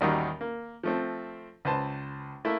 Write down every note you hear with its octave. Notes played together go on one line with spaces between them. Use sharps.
A1 D#2 D#3 G3 F#4 A#5
A#3
F3 A3 C4
C#2 B4 C5 A5
A3 A#3 E4 E5